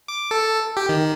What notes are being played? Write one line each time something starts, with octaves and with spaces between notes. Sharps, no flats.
D6
A4
G4
D#3